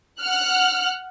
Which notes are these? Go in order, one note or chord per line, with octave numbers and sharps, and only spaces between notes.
F#5 F6 F#6